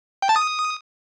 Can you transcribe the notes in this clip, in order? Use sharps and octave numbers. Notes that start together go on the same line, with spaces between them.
G5
A5
D#6